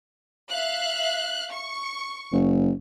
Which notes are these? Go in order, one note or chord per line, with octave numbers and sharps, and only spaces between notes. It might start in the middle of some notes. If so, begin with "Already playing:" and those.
E5 F5 F#6
C#6
F#1